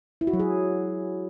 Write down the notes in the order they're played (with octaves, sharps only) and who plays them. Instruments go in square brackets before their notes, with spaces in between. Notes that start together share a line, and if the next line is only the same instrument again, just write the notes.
[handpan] E4
F#4
F#3
G#4